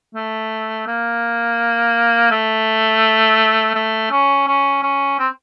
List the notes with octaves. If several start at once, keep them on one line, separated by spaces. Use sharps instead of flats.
A3
A#3
A3
A3
C#4
C#4
C#4
C4